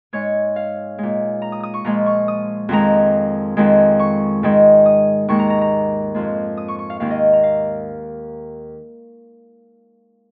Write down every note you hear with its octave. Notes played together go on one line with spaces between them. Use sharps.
G#2 G#3 C#5
F5
A#2 G#3
A#5
D#6
D#6
C#6
A#2 F3 G#3 A#5
C#6
D#6
F2 D#3 G#3 A#5
F2 D#3 G#3
C#6
G#2 D#3 G#3
D#6
D#2 D#3 G#3 C#6
A#5
A#5
A#5
F2 F3 G#3
D#6
C#6
C#6
F5
D#2 D#3 G#3 F5
D#5
A#5
F5